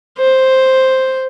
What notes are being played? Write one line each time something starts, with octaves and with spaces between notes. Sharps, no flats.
C5